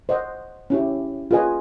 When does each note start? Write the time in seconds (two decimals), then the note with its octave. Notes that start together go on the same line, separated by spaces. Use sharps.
0.09 C5 D#5 F#5
0.70 C#4 E4 G4
1.31 F4 G#4 B4 D#5 G#5